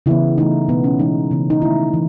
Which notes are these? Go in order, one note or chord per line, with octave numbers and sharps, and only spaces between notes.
C#3 E3 B3 E4
E3 A3 D#4
B2 G#3 B3
C#4
E3 G#3 B3 D#4
C#3 E3 B3
D#4
D#3 A3 E4
E3